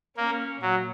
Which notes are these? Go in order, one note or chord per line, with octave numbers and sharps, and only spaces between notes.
A#3 C#4
A#2 F#3